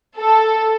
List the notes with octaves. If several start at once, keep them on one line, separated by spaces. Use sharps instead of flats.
A4